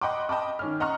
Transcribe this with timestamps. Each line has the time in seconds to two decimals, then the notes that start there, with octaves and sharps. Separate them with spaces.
0.01 D#5 F#5 G5 B5 C6 D6
0.29 D#5 G5 A5 B5 D6
0.59 D#3 C#4 F6
0.80 D#5 F#5 A#5 C6 C#6 F6